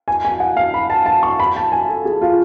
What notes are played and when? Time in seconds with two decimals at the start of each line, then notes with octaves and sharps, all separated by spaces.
0.08 G#5
0.25 G#5
0.40 F#5
0.57 F5
0.74 B5
0.90 A5
1.06 A5
1.23 C#6
1.40 B5
1.56 A5
1.72 G#5
1.89 A4
2.05 G#4
2.21 F4